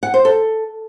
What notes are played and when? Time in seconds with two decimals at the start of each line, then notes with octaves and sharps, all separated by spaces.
0.03 F#5
0.14 C5
0.25 A4